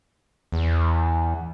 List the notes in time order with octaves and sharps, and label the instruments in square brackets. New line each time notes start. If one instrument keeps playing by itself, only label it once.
[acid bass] E2